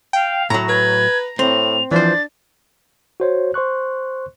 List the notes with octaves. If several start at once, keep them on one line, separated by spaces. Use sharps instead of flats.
F5 G5
A2 F#3 A#5
B4 G#6
A2 C4 F7
E3 F3 D4 C5 A6
F#4 C5 C#5
C5 C6 C#6 F#6